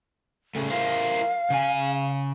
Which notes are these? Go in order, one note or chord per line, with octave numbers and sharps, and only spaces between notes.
C#3 A3
E4 A#4 C5 F5
C#3 G#5